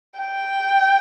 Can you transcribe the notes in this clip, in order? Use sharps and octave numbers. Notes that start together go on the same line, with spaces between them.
G5